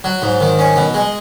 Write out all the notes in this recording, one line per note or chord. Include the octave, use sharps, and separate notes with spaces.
F#3
G#2
D#3
C#4
B2
G#3